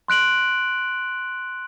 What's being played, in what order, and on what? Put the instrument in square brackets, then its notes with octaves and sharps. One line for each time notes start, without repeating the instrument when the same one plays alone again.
[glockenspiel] C6 F#6 D7 F#7